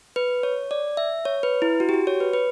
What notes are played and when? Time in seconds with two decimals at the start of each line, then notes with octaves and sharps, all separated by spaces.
0.16 B4
0.43 C#5
0.71 D5
0.97 E5
1.25 C#5
1.43 B4
1.62 E4
1.80 F#4
1.89 G4
1.94 F#4
2.07 C#5
2.20 B4
2.33 B4